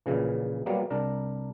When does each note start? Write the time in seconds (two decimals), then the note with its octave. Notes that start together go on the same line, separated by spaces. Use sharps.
0.06 A#1 A#2 C#3 E3
0.66 F#3 G3 A#3 B3
0.90 C2 D4 A#4